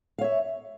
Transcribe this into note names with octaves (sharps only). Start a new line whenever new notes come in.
C#5 E5 F5